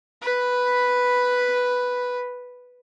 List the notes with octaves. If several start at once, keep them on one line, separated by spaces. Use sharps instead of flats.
B4 B5